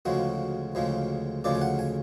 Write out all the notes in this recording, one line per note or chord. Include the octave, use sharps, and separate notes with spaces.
D2 C#3 F3 G#3 F#4
D2 C#3 F3 G#3
D2 C#3 F3 G#3 D5
G#5
F#5
G#5